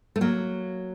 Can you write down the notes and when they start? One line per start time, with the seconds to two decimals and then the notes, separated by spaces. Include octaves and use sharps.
0.16 A3
0.21 F#3 A#3